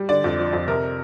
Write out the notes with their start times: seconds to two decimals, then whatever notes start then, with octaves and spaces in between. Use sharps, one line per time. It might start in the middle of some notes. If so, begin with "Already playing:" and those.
Already playing: G3
0.09 D3 D5
0.24 F2
0.39 F3
0.53 F2
0.68 C3 A#4